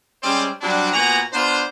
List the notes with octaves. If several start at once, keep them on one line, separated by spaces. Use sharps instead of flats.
G3 G#3 C4 C#4 C5 D5
F#3 G3 C4 D4
A#2 B3 F#4 G#5 A#5
B3 D4 F4 C5